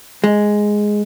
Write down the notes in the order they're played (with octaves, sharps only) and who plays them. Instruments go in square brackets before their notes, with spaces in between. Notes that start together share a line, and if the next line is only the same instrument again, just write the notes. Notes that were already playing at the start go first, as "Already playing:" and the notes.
[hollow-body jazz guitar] G#3